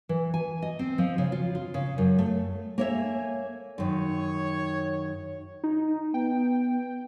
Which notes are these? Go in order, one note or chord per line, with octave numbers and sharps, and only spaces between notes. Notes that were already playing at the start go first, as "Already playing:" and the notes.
E3
G#5
D#5
C4
F3
C#3
F4
F4
C#3
F#2
A3
A#3 A4 C#5 E5 G#5
F#2 D#3 C#5
D#4
B3 G5